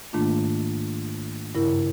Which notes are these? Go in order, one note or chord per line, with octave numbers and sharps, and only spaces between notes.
G#2 D#3 A3 A#3 D4 F4
G2 C#3 E4 A#4